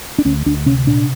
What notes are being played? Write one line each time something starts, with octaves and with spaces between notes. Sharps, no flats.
D4
D2 C#4
D2 D4
C3 C#4
A#2 D4